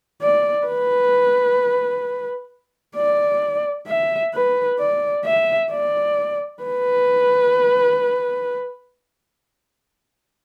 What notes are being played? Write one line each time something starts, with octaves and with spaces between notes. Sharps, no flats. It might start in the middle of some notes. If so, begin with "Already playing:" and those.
D5
B4
D5
E5
B4
D5
E5
D5
B4